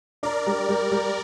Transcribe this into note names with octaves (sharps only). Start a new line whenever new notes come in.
D4 A#4 D5
G3
G3
G3